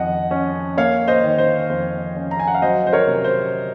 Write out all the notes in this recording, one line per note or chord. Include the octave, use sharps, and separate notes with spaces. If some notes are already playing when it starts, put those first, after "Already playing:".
Already playing: F2 D#3 D#5 F#5
C#4
A#3 C#5 F5
C5 D#5
D#3
C5
F2 C5
C#4
A#5
G#5
F#5
F5
F#3 C5 D#5
C5
A#4 C#5
C3
C5